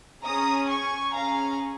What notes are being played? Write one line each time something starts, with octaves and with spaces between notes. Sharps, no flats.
C#4 G#4 A#5 D#6
G#5 C#6
C#4 G#4 F5 A#5